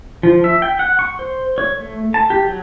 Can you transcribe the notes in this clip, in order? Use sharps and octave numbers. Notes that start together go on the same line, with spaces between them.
F3
E5
G5
F#5
C#6
C5
C#5
A3
A5
G4
F#3